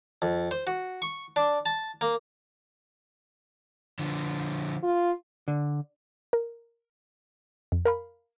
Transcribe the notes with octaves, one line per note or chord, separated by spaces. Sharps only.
F2
C5
F#4
C#6
D4
A5
A#3
D3 F3
F4
D3
A#4
F2
A#4 F5 B5